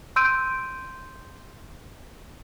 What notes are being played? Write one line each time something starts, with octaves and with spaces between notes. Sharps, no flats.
C6 E6 G6 D7 D#7